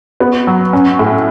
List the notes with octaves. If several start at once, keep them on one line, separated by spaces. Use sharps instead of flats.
B3
F#3
C#4
A2